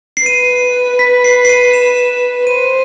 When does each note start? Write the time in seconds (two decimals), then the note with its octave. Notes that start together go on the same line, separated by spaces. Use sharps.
0.17 C7
0.26 B4 D#7
0.99 B6
1.24 C7
1.45 C7
1.49 D#7
1.73 E7
2.47 C5 D#7